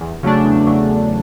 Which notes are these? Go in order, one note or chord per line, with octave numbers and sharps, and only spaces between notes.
E2
C#3 F#3 A3 D4
E2
C#3 F#3 A3 D4
E2